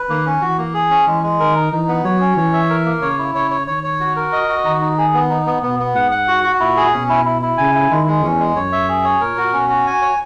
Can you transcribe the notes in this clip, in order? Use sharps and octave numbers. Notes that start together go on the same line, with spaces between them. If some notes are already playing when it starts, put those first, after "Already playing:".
Already playing: B4
D#3 A#3
C#4
E3 F#4
A#3
G#4
C#4
E3 G#3
G#3
D#3 A#4
D#4
E3 D#4
B3
F#3 C#5
C#4
E3 C#5
E5
A#4
A#3
C#3 C#5
E4
C#3 C#5
C#5
D#3 C#5
C#5
F#4
A#4
D#5
F#4
D#3 D#4
D#4
G#4
B3
D#4
B3
B2 B3
B3
G#2 F#5
F#5
F#4
F#4
A#2 E4
G#4
B2 C#4
E4
E4
E4
C#3 G#5
E4
D#3 G#3
G#3
E2 C#4
G#3
F#2 C#5
E5
G#4
C#5
A#2 A#4
F#4
B2 C#4
F#4
G#5
C#5